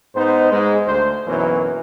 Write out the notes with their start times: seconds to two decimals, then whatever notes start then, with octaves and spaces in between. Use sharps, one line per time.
0.15 G#2 B3 D#4 C5
0.52 G#2 G#3
0.87 D2 C5
1.27 B1 F#2 E3 F#3 A#3 B3